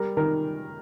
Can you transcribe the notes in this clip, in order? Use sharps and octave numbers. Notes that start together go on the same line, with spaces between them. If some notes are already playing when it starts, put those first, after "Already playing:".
Already playing: G3 A#4
D#3 A#4